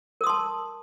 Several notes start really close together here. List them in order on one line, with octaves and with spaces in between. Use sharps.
A#4 D#6 C6 A5